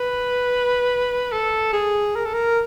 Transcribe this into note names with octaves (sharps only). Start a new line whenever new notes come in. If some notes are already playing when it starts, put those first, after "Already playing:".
Already playing: B4
A4
G#4
A#4
A4
A#4